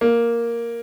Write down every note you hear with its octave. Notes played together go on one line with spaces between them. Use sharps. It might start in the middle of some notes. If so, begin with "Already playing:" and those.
A#3